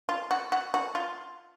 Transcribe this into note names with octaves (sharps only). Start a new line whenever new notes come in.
F4
F#4
F#4
F#4
F4